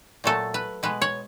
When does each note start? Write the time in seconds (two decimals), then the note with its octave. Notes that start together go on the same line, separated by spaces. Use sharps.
0.24 A#2 F#3 A3 A4
0.54 B4
0.83 B2 G#3 B4
1.02 C#5